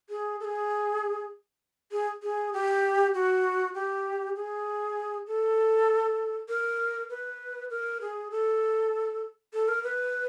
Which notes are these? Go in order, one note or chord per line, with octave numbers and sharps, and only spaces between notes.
G#4
A4
G#4
G#4
G#4
G4
F#4
G4
G#4
A4
A#4
B4
A#4
G#4
A4
A4
A#4
B4